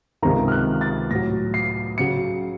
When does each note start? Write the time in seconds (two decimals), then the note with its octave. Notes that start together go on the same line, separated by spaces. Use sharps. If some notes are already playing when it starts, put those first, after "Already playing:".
0.22 C#2 C3 D#3 A#5
0.48 F6
0.52 F#6
0.81 A6
1.11 A2 F#3 A#6
1.54 C7
1.98 C#3 F#3 C#7